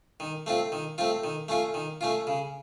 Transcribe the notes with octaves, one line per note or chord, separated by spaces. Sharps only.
D#3
A3 C4 F4
D#3
A3 C4 F4
D#3
A3 C#4 F4
D#3
A3 C#4 F4
C#3